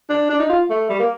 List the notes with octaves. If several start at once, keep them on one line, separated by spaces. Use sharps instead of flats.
D4
D4
D#4
F4
A3
G3
A#3